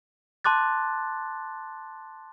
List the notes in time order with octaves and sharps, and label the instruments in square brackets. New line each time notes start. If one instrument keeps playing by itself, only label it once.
[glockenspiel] A5 C6 D6 F#6 A6